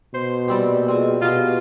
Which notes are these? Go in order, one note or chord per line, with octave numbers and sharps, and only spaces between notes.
B2 C5
A#2 G3 C4 G4
C4 F4 G#4 D#5
B2 A#3 F4 G4 B4 D#5 F#5